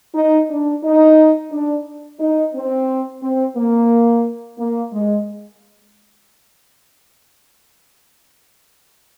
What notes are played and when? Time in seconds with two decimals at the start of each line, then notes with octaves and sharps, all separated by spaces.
0.15 D#4
0.50 D4
0.84 D#4
1.52 D4
2.20 D#4
2.54 C4
3.22 C4
3.56 A#3
4.58 A#3
4.92 G#3